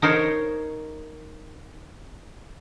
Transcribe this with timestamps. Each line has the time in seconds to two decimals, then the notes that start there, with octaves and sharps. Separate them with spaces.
0.02 D#4 A#4 C5 C#5